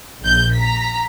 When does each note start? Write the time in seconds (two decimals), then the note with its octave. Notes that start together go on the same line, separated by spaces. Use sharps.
0.21 A#1 G6
0.55 A#5 B6